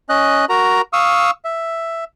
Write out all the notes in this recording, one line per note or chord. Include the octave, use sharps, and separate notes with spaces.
C#4 D#5 F#6
F#4 A#4 A#5
F5 C#6 D#6 E6
E5